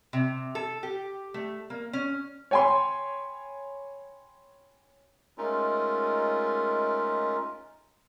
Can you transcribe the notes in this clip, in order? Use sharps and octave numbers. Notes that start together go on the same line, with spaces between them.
C3
A4
G4
A3
A#3
C#4
C#5 G5 G#5 B5 C6
G#3 A3 C#4 D#4 F4 A#4